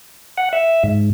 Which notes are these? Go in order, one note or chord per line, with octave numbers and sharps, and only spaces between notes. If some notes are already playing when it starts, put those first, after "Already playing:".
F#5
E5
G#2